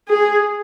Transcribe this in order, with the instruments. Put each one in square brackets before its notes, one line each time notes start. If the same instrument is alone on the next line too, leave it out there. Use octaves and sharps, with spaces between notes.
[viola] G#4